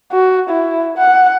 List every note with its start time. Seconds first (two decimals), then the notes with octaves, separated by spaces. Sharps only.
0.12 F#4
0.49 E4
0.97 F#5